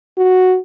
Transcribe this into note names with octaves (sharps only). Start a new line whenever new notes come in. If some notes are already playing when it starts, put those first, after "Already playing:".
F#4